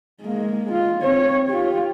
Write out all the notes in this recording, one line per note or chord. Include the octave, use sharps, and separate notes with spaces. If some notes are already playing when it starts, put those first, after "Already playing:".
G#3 A#3
F4
C4 C#5
F4 G4